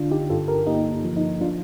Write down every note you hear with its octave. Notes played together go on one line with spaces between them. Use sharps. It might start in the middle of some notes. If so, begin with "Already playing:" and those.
Already playing: D3 D4 F4
D#4 G4
G2 F4 A4
G4 A#4
A#3 D#4 G4
D#4
F3
D#4
F3 D4 F4